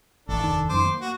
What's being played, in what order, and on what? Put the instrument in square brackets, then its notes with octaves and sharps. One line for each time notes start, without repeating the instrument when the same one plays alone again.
[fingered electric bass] A1 [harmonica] D4 A4
[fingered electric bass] F1 D#2 D#3
[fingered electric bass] F#2 D#3 [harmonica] C5 D6
[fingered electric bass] A#3
[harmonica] F#4